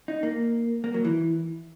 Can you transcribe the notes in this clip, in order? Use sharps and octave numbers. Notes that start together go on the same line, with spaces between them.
D#4
A#3
A#3
F#3
E3